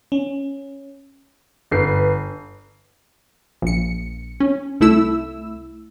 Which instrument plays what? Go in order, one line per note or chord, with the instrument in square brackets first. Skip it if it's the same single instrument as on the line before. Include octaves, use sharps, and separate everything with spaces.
[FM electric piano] C#4
[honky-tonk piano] G1 B4 C7
[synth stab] A#1 C#7
C#4
C2 A3 E4 E6